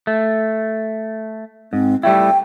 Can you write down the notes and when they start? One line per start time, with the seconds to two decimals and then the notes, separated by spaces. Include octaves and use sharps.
0.07 A3
1.73 G#2 C4
2.03 G3 A3 E4 G5